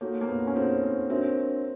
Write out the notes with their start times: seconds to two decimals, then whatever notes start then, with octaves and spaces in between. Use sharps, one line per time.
0.01 A#3 D#4 F#4 A4 C#5
0.21 A#3
0.28 B3
0.47 C#4
0.55 C4 D#4 F#4 A4 C#5
0.83 C4
1.10 C4 D4 F#4 A#4 C#5 E5